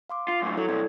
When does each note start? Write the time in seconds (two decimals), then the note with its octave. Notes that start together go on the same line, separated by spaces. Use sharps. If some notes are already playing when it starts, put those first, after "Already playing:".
0.10 F5 C6 D6
0.28 F4
0.42 F#2 A2
0.58 F#3 E4 A4 C#5
0.69 G2 C3 G#6